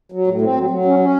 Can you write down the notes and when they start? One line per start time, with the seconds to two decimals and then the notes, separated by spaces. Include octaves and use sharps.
0.12 F#3
0.27 A2
0.41 C4
0.56 F#3
0.70 F#3
0.85 C#4
0.99 C#4